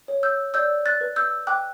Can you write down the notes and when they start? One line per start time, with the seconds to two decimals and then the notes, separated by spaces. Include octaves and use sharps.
0.08 C#5
0.23 E6 G6
0.54 D5 E6 G6
0.86 F#6 A6
1.01 B4
1.16 E6 G6
1.47 G5 D6 F#6